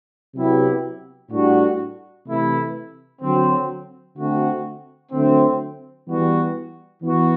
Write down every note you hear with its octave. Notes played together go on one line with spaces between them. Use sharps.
C3 F#3 B3 E4 G4
A2 G3 D4 F#4
C3 E3 A3 E4
D3 F#3 C4
D3 A3 C4 F#4
D3 F#3 A3 C4
E3 G3 B3 F#4
E3 B3 F#4